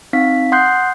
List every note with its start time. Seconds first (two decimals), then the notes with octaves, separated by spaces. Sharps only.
0.13 C4 D#4 F5 B6
0.52 F#5 C6 D#6 F#6 G6 C7